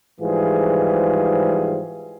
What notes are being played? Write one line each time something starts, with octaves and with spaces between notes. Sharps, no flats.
G#2 E3 F3 G3 G#4